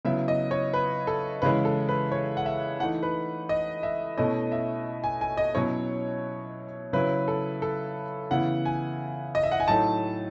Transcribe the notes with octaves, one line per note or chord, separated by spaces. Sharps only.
C#3 F#3 B3 E4 E5
D#5
C#5
B4
A4
C#3 E3 G#3 C#4 E4 B4
A4
B4
C#5
F#5
E5
E3 A3 D#4 F#5
B4
D#5
E5
B2 A3 C#4 E4 D#5
E5
G#5
G#5
D#5
B2 F#3 C#4 E4 C#5
C#3 F#3 C#4 E4 B4
A4
A4
C#3 E3 B3 E4 F#5
G#5
D#5
E5
F#5
G#5
A2 F#3 A3 D#4 A5